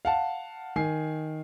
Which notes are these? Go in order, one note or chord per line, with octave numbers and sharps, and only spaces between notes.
F5 F#5 A5
D#3 G#5 C7